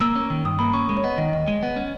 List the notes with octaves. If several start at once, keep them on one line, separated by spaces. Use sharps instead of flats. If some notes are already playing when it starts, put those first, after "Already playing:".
A#3 E6
C#4
D#3
G2 D#6
A#3 B5
C#4 C#6
G#3 B5
C#5
B3 D#5
D#3 D#5
D#2 D#5
G#3
B3
C#4